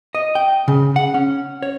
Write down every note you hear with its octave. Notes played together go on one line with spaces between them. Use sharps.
D#5
G5
C#3
F#5
C#4
C#5